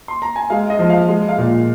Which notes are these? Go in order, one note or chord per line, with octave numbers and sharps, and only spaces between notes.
C6
A#5
G#5
G#3 F5
D#5
F3
F5
G#3
F5
A#2